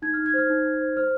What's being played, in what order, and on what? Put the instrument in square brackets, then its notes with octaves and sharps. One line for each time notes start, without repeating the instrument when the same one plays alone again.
[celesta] D#4 G#6
F6
D#4
G#6
C5 F6
D#4
D#4
C5
C5 F6